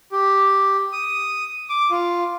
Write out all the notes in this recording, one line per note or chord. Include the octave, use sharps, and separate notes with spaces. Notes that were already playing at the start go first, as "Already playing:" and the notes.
G4
D#6
D6
F4